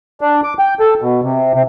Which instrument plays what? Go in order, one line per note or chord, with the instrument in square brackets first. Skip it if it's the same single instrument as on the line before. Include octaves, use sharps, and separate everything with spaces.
[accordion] D4
D6
G5
A4
B2
C3
C3